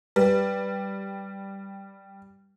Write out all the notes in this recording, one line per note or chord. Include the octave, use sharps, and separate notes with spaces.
G3 B4